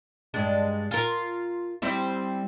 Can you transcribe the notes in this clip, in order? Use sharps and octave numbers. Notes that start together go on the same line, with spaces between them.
G2 G#3 D4
F4 A#4
G3 C4 E4